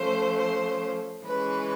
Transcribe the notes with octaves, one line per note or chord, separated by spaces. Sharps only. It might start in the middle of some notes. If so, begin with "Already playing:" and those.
Already playing: F3 A3 C#4 C5
C5
E3 G#3 C#4 B4